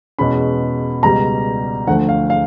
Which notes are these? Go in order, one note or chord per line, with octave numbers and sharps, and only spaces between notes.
E2 B2 G#3 C#4 B5
C#2 B2 G3 A#5
D2 D3 F3 A3 F#5
F5
F5